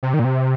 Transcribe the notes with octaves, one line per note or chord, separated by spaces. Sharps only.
C3
D#3
A#2
C3